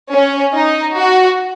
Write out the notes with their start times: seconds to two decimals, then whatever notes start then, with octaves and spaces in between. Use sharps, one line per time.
0.12 C#4
0.54 D#4
0.96 F#4